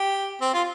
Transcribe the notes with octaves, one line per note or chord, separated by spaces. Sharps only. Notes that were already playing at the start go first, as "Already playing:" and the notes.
Already playing: G4
C4
F4